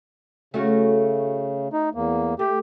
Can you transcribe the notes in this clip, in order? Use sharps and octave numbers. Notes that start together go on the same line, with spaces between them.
C#3 A3 C#4 F#4
D#4
E2 A#3
A3 G4